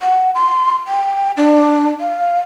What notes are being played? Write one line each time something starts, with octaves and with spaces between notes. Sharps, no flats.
F#5
C6
G5
D4
F5